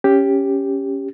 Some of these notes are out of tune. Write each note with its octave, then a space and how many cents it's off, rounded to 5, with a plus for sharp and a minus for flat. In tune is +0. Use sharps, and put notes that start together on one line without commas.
C#4 +0 G4 +5